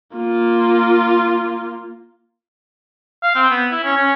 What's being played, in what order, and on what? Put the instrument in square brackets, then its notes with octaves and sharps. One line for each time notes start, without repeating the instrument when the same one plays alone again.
[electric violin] A#3 F4
[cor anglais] F5
C4
B3
E4
C#4
C#4